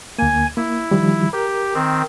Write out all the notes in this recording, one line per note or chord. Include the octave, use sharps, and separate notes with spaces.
D2 A#3 G#5
A#3 E4
D#3 F3 G3
G4 A#4
D#3 C4